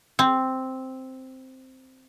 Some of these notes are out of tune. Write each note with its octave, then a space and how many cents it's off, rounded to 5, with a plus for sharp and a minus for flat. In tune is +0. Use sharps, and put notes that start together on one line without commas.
C4 +0